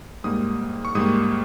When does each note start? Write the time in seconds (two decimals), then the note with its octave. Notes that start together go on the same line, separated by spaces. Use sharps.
0.24 G#2 G3 A#3 D#6
0.85 C#6
0.95 G#2 G3 A#3 D#6